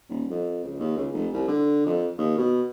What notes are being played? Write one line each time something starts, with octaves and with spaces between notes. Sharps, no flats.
D#1
F2
C#2
D#2
C#2
F1
C2
D3
F2
D#2
B2